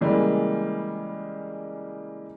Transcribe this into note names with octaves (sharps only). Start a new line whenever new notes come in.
C#3 E3 G3 G#3 A#3